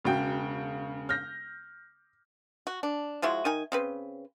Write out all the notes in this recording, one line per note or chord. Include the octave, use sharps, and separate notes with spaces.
E1 C#3 F#4 G5
F6 G6 A#6
F#4
D4
F3 G#3 E4 F#4
D#3 D#4 G#5
C#3 C4 B4